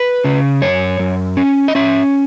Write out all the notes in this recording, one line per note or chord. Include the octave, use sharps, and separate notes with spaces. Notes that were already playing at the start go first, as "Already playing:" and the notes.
Already playing: B4
C#3
F#2 C#5
F#2
C#4
D#5
C#4 E5